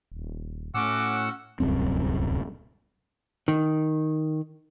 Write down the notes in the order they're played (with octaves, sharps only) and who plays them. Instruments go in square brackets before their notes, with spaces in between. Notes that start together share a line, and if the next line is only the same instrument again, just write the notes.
[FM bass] D#1
[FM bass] A2 [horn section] C#4 F#4 [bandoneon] F#5 E6 [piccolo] D6
[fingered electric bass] D1 C2 F#2 C4
[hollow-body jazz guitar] D#3